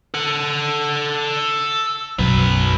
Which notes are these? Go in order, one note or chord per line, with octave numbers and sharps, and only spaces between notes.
A4 F#5
B1 F#2 F#3 B4